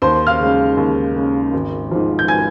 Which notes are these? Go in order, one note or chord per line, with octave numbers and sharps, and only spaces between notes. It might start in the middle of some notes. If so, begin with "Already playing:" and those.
D#2 C5 C6
F5 F6
C#3 G#3
D#2
C#3 G#3
G#1
G#2 F3
G6
G#5 G#6